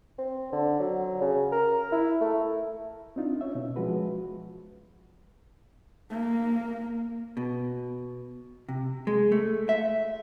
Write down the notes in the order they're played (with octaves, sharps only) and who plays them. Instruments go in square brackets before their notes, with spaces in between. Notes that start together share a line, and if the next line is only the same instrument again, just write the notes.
[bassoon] C4
D3
F#3
C#3
A#4
E4
A3
[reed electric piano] C4 D4 D#4 F4
C#4 C#5 E5
B2
F3 G#3 F#4 B4
[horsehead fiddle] A#3
[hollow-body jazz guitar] B2
C3
G#3
A3
E5